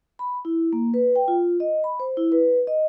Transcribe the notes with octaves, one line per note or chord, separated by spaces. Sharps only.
B5
E4
A#3
B4
G5
F4
D#5
B5
C5
E4
B4
D#5